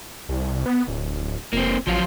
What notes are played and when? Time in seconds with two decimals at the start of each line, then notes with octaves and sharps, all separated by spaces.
0.29 C2
0.66 B3
0.87 D1
1.53 F1 A#3 C4
1.87 A1 F3 F#3 F4